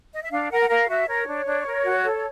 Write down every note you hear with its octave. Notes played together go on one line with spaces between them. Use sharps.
D#5
E5
D4 F5
A#4 F#5
F#5
A#4 F5
F#4 E5
A#4 C#5
D4
D4
A#4
F#4
A4